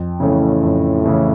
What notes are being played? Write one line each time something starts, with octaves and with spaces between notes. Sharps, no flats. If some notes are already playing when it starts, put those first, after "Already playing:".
Already playing: F2
A2 C#3 E3 A3 C#4
F2
C#3 E3 A3 C#4